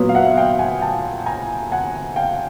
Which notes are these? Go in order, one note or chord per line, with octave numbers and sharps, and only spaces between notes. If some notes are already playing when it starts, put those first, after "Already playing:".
Already playing: A#2 F#3 B3
F5
E5 F#5
F5 G5
F#5 G#5
G5 A5
G#5 A#5
F#5 G#5
F5 G5